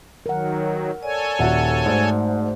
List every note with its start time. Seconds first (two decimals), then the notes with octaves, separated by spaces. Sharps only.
0.26 D#3 F#3 A#4 F#5
1.03 A4 C#5 D5 G#5
1.39 D#1 F#4 E5 F#5
1.86 G#2 A3 C5 D5